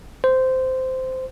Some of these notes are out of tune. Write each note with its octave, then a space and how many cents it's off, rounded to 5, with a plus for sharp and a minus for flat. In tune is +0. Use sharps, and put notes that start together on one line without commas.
C5 -10